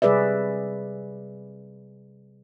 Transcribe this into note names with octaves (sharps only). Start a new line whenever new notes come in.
C3 G3 G#4 B4 D5 E5